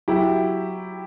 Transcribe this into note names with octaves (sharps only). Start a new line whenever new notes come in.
F#3 E4 G4